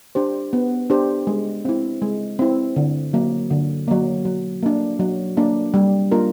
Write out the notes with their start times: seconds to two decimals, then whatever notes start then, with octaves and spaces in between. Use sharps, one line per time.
0.15 D4 G4 C5
0.53 B3
0.90 D4 G4 C5
1.27 G#3
1.65 C4 E4
2.02 G#3
2.39 C4 E4
2.76 D3
3.13 F#3 A#3
3.50 D3
3.88 F#3 A#3
4.25 F#3
4.63 A#3 D4
5.00 F#3
5.37 A#3 D4
5.74 G3
6.11 A#3 D4 F4 A#4